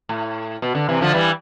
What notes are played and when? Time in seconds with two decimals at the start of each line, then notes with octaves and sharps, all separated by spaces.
0.09 A2
0.62 B2
0.75 D3
0.89 C3 E3
1.01 D3 F3
1.14 E3 G3